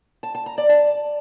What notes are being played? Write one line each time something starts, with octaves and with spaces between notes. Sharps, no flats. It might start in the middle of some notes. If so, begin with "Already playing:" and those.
A5
A5
A#5
D5
A5